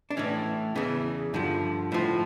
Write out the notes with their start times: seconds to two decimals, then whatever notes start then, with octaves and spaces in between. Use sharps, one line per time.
0.10 D4
0.17 A2 E3 C#4
0.75 E2 C#3 E3
1.34 G2 D3 F3
1.92 A2 F3